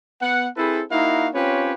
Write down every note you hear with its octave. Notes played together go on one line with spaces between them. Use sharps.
B3 F#5
C4 E4 G#4 A4 B4 C5
A#3 D#4 E4 F#4 A#4 F5
C4 C#4 F4 G4 B4 C#5